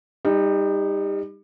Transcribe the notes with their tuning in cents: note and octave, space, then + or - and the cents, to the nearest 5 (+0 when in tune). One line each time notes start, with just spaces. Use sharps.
G3 +25 D#4 +0